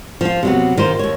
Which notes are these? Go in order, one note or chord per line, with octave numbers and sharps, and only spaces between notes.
F3 F4
C3 F#3 B3
D#3 F4 C5
D#2 C#5